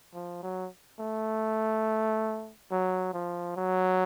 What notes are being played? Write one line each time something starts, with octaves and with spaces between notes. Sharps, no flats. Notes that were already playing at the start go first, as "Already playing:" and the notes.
F3
F#3
A3
F#3
F3
F#3